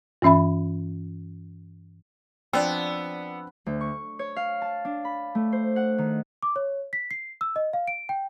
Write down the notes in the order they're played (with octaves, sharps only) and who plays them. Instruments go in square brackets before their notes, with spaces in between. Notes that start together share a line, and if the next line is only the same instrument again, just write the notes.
[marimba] G2 E3 C#4 E5 B5
[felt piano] F3 D5 E6 [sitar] B3 [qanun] C4 D4 [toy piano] G5
[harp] D2
C#6
C#5
F5
A5
D4
B5
A3
C5
F#5
D#3
[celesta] D6
C#5
B6
C7
E6
D#5
F5
D7
G5